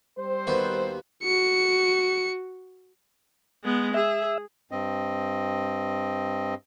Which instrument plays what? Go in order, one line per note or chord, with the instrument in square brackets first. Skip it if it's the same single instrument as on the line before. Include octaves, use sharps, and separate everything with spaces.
[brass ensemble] G3 C4 C5
[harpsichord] D#2 B3 F#4
[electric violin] F#4 C#7
[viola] G#3 B3
[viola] G#4 [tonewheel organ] E5
[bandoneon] G2 C4 D#5